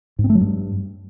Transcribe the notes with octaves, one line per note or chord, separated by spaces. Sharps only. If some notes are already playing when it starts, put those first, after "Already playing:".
G#2
C4
A3
F#3
G2